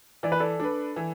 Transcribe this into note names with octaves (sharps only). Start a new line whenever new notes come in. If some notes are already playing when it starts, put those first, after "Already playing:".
E3 D5
B4
A4 D5
D4 B4
E3